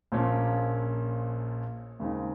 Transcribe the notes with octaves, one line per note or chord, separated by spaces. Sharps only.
A#1 A#2 F3 A#3 C#4
D#2 C#3 G#3 C4 D#4